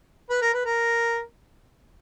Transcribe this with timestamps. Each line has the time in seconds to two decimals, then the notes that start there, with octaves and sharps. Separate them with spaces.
0.30 B4
0.42 A#4
0.53 B4
0.65 A#4